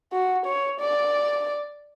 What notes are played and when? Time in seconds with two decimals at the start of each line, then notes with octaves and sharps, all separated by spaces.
0.13 F#4
0.46 C#5
0.80 D5